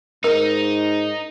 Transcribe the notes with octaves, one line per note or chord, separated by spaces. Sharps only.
G#2 D#4 A#4